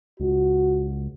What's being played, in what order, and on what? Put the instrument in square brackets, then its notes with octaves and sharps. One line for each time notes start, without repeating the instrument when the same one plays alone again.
[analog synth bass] C#2 [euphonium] F#4